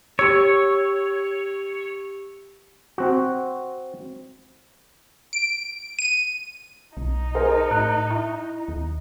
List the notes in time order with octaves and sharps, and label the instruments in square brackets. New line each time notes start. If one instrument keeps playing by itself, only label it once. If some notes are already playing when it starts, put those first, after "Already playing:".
[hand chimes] G4 E6 [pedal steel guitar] C#5
[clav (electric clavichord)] C4 F#4
[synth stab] D7
D#7
[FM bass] B1 [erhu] D#4
[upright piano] G#4 A#4 C5
[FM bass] A2 [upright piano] F#6
[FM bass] E4
D#2